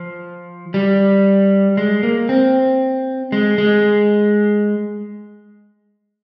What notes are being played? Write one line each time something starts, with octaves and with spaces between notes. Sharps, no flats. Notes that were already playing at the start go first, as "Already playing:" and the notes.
Already playing: F3
G3
G#3
A#3
C4
G#3
G#3